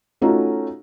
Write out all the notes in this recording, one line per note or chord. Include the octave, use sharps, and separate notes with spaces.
A3 C#4 D#4 F4 F#4 A4